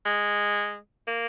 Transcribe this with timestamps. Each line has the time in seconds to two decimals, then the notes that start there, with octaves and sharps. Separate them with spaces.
0.06 G#3
1.08 A#3